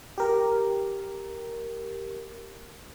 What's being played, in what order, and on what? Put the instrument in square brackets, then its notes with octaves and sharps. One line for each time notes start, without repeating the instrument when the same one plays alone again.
[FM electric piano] G4 A#4